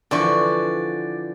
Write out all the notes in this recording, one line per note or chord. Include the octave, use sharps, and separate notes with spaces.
D3 E3 F3 D5 C#6